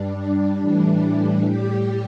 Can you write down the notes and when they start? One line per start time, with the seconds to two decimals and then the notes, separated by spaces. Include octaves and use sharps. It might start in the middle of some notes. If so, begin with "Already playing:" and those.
Already playing: G2 G3 D4
0.17 D4
0.58 A2 E3 G3 D4
1.42 A2 G3 G4